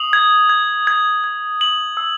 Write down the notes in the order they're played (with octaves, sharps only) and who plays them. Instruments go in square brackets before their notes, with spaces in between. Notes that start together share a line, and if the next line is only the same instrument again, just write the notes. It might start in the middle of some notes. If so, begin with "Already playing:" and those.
Already playing: [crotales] D#6 F#7
G#6
G#6
G#6
G#6
F#7
E6